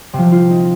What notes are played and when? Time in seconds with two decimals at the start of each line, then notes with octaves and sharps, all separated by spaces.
0.13 C3 F3 C4
0.32 F4
0.50 D#4